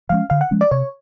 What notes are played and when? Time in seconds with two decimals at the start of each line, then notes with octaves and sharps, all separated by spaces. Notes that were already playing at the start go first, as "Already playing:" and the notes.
0.09 F3 G#3 C#4 F5
0.30 D3 F5
0.41 F#5
0.51 F3 G#3 C#4
0.61 D5
0.71 C3 C#5